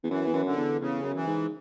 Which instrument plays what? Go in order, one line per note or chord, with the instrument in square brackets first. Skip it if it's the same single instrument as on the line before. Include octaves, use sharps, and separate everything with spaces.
[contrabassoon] E2
[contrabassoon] F#2 [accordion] E3
[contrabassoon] E2
F#2
[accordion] D3
[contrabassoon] E2
[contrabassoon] E2 [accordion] C#3
[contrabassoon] F#2
[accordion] E3
[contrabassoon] G#2